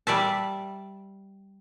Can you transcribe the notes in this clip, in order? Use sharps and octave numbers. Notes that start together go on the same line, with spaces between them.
G3 D5 E5 A5